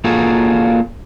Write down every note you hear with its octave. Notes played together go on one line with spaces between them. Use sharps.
A#3 F4 F#4 G#4 A4